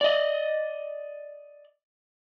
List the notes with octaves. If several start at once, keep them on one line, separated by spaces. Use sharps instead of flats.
D5 D#5